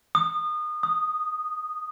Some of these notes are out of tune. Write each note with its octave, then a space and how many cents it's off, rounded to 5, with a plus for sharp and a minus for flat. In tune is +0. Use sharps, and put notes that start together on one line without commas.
D#6 -30
D#6 -5